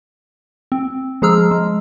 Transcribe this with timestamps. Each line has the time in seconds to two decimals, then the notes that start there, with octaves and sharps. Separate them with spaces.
0.72 C4
1.22 F3 G#3 G#4 A#5 E6 F6
1.51 G#3